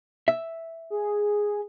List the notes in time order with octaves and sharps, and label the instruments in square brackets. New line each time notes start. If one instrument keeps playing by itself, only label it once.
[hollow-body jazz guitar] E5
[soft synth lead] G#4